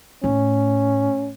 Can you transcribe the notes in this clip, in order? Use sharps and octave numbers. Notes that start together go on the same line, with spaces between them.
A2 C#4